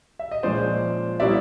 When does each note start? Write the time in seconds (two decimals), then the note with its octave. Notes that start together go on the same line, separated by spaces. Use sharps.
0.19 E5
0.31 D#5
0.43 A#2 F3 G#3 C#4 C5 D5
1.20 B2 G3 A#3 C#4 E4 D5 E5